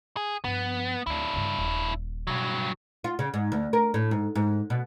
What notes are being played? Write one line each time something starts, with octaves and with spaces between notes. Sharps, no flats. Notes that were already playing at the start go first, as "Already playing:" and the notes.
G#4
G2 F3 B3
D2 D4 E4
G2 C#3
D#1
G2 B2 F#3
F4
C#3
G#2
D2
A#4
A2
G#2
G#2
B2